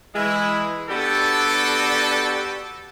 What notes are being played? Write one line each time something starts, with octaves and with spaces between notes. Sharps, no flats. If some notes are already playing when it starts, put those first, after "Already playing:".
E3 G#3 E4
B3 D4 F#4 G4 A4